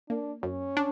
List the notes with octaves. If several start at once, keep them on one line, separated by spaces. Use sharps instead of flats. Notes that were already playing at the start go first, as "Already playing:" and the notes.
A#3 D4
F#2 C#4
D4